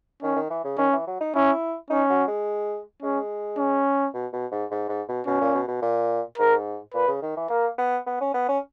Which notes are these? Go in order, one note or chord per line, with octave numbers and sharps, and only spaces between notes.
D#3 C#4
D#3
E3
C#3
D#3 C#4
E3
F#3
D#4
C#4 E4
C#4 D#4
F#3
G#3
G#3 C#4
C#4
B2
B2
G#2
G#2
G#2
B2
B2 C#4
A#2
B2
B2
A#2
G#2 A#4
A#2 B4
C#3
D#3
E3
A#3 A#4
B3
B3
C#4
B3
C#4